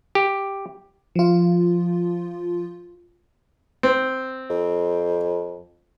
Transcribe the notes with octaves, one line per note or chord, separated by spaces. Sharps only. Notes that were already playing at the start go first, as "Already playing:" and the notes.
G4
F3 F4
C4
F2